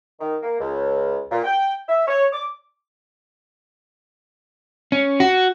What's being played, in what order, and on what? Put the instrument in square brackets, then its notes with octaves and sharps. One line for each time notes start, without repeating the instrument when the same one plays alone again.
[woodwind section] D#3
A#3
C#2
A#2
G5
E5
C#5
D6
[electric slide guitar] C#4
F#4